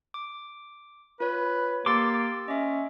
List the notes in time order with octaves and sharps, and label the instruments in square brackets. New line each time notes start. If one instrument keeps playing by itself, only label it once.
[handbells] D6
[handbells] F4 C#5 [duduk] B4
[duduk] A#3 [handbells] G4 E6 A6 [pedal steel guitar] C6 D6
[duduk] C#4 [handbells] D#5 E5